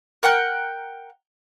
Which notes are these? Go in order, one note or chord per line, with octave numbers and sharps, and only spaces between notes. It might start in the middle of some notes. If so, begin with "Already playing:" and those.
A#4 F#5 G5 F#6